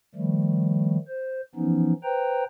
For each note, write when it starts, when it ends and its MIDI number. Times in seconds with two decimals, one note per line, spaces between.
0.15 0.98 51
0.15 0.98 53
0.15 0.98 55
0.15 0.98 57
1.08 1.41 72
1.55 1.93 52
1.55 1.93 53
1.55 1.93 59
1.55 1.93 61
1.55 1.93 63
2.04 2.44 71
2.04 2.44 72
2.04 2.44 79
2.04 2.44 82